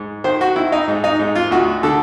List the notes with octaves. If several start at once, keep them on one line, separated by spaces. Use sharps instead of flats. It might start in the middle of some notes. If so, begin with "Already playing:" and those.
Already playing: G#2
D#3 C5
F#4
D#3 E4
D#4
G#2
D#4
G#2
F4
D2 F#4
D3 A4